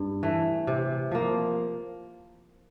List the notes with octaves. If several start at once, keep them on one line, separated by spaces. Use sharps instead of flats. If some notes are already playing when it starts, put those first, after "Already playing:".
Already playing: G2
E3 A3
C3
F3 A#3